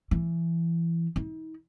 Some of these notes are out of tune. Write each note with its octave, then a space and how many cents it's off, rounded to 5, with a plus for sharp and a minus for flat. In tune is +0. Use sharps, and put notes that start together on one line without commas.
E3 +25
D#4 +40